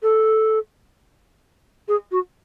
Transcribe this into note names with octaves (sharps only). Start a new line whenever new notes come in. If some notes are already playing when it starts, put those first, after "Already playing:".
A4
G#4
F#4